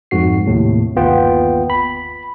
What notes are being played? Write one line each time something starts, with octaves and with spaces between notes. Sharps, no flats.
F2 G#2 F#4 C7
D#2 A2 C3
G1 D#2 B3 F4 G5
B5